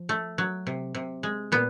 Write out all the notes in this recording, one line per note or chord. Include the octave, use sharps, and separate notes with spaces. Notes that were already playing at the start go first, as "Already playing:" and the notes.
Already playing: F3
A3
F#3
C3
C3
G#3
A#2 B3